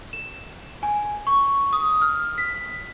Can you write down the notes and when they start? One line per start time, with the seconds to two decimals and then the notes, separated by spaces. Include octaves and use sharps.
0.13 E7
0.83 G#5
1.27 C#6
1.73 D#6
2.02 F6
2.38 B6